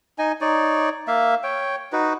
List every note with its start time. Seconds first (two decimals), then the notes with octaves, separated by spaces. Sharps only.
0.19 D#4 D#5 G#5
0.41 D#4 C#5 D5
1.08 A#3 E5 F5
1.44 C#5 G5
1.93 D#4 F#4 B4